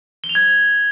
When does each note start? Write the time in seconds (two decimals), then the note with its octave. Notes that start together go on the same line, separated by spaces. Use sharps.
0.24 G7
0.29 F7
0.35 G#6